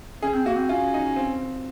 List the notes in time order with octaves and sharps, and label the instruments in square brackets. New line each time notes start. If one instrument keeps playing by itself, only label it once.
[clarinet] C#4 [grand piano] G#4
[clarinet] C4
[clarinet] A#3 [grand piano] F#4
[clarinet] C4
[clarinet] C#4 [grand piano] F4
[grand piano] D#4
C4